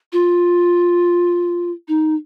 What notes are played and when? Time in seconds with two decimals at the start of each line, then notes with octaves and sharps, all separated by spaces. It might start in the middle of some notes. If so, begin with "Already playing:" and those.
0.13 F4
1.88 D#4